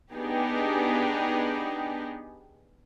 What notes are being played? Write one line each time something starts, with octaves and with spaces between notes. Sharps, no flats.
B3 D4 D#4 G4 G#4